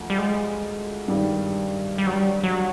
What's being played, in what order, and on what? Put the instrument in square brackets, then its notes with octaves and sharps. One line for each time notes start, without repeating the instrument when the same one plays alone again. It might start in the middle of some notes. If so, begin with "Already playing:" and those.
Already playing: [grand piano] D2 F3
[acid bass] G3
G#3
[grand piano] G2 D#3 G3
[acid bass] G3
F#3
G3
F#3